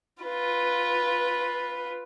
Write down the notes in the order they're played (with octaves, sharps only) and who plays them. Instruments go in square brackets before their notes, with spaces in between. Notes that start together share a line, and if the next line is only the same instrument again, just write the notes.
[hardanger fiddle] F4 B4